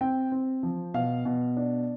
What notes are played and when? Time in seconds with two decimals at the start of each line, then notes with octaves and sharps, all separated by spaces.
0.01 C4 G5
0.32 C4
0.63 F3
0.94 B2 F5
1.25 B2
1.57 D4